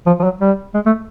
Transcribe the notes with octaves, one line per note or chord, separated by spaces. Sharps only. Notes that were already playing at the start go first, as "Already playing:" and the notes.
F3
F3
F#3
G3
G#3
A3